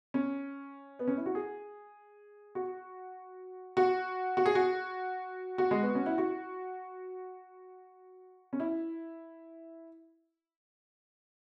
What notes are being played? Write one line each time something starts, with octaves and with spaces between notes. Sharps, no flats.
C#4
B3
C#4
E4
F#4
G#4
F#4
F#4
F#4
G#4
F#4
F#4
G#3
B3
C#4
E4
F#4
C#4
E4